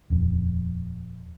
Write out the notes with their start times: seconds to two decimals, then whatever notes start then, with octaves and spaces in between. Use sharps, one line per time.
0.10 D#1 F2